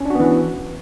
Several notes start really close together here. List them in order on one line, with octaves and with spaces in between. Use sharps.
C#4 D4 F#4 B3 E3